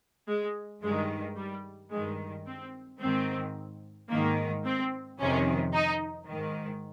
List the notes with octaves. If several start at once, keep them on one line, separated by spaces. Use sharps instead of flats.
G#3
G2 D#3 G#3
G3
G2 D#3 G#3
C4
G#2 D#3 C4
G#2 D#3 A#3
C4
F2 C3 D#3 C#4
D#4
G#2 D#3